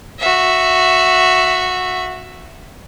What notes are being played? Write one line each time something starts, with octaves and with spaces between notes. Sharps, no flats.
F#4 E5